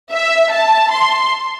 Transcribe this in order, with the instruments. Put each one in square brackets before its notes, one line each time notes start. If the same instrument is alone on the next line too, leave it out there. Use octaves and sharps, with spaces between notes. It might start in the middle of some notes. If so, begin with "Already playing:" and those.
[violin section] E5
A5
C6